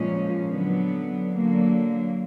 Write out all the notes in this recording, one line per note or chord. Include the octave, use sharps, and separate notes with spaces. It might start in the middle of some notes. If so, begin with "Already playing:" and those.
Already playing: A#2 F3 G#3 C#4
D3 F#3 B3
D3 F#3 A#3